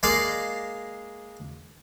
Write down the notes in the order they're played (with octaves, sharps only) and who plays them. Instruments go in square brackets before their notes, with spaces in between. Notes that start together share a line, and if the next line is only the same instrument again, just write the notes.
[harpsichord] G#3 A#3 D5 F5 C6